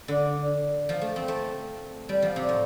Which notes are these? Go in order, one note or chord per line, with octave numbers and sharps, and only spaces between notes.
D3
F3
A3
C4
A3
G3
F3
C3
A2